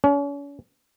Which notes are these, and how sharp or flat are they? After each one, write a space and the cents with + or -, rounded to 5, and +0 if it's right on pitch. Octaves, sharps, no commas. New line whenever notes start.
C#4 +40